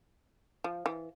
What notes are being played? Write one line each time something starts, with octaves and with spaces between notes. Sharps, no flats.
F3
E3